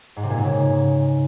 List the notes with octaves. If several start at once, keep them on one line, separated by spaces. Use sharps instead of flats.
G#2
C3
A#2
G#2
C#3